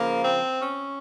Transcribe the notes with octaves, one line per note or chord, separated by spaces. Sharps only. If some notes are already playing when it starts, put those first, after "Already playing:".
Already playing: C#3 F3 A#3
C4
C#4